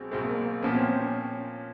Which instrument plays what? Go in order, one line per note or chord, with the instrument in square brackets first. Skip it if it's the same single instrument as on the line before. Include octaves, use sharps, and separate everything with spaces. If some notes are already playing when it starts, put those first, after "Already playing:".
Already playing: [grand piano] B1 B2 G#3 C4
B1 B2 G#3 C4
[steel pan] A#3
A#3
[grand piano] A#2 F3 A#3 C#4 [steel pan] B3
[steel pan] C4
C4
C#4